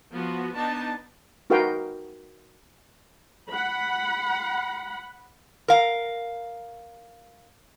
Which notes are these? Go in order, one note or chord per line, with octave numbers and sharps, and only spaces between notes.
F3 B3 F#4
B3 D4 D#4 A5
D#4 F#4 A#4 B4 F5 G5
F#5 B5
A#4 F5